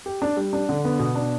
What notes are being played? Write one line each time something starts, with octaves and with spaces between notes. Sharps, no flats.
G4
D4
G3
D4
D3
B3
B2
D4